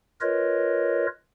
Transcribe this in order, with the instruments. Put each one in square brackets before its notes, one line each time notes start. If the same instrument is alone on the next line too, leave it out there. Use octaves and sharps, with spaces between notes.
[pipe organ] F4 A#4 B4 C#5 D#5